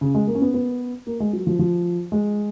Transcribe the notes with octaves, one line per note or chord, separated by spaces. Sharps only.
C#3
G#3
A#3
C#4
B3
B3
A#3
G#3
F#3
F3
F3
G#3